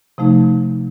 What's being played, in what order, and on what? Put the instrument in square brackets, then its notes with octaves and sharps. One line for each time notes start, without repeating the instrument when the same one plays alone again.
[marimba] C3 F3 A3 D#4